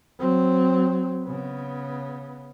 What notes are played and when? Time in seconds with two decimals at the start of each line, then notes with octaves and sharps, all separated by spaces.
0.19 F#3 C4
1.24 C#3 B3